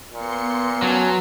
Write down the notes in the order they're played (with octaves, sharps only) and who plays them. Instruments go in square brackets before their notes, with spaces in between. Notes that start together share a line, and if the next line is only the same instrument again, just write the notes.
[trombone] A#2 [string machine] B3 C6 C#7
[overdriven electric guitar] F#3 [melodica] C#4 G#5 A5